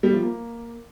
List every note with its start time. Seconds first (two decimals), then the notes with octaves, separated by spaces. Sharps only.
0.03 G3
0.13 F3
0.22 A#3